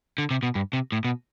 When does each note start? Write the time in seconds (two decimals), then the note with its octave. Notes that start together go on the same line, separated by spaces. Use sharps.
0.18 D3
0.31 C3
0.43 B2
0.55 G2
0.73 C3
0.92 A2
1.05 B2